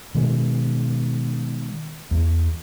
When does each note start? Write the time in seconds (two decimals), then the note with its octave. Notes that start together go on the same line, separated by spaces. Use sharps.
0.15 B2 D#3 G#3
2.11 E2